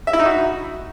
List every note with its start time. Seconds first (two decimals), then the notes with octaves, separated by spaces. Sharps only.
0.07 E5
0.13 E4
0.19 D#4
0.26 F#4